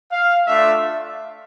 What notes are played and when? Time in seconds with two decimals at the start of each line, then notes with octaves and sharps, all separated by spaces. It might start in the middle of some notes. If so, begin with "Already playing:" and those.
0.12 F5
0.47 A3 D4 F4 E5